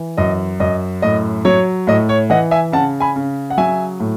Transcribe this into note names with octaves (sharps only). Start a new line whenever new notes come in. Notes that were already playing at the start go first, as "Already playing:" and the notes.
Already playing: E3
F#2 D#5
F#2 D#5
A2 D#5
F#3 C#5
A2 D#5
C#5
E3 D#5 F#5
E5 G#5
C#3 F#5 A5
G#5 B5
C#3
F#5
F#3 E5 G#5
A2